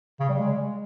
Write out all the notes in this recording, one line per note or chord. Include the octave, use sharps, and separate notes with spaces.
C#3
G3
G#3